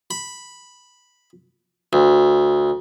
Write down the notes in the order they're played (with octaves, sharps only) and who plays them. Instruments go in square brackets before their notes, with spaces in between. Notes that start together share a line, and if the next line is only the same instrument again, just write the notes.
[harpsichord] B5
D2